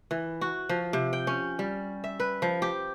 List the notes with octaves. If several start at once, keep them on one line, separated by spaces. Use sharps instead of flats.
E3
F#4
F3
C3
G5
C#4
G3
E5
B4
F3
G4